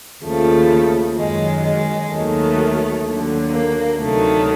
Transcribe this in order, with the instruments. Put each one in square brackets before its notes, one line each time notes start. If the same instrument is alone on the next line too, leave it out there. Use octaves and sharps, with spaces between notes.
[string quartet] D#2 C#3 F3 A3
F#2 D#3 F#3 G#3
G#3
D#2 D#3 F#3 A3
D#2 D3 F#3
A#3
D2 C3 D#3 F#3 A3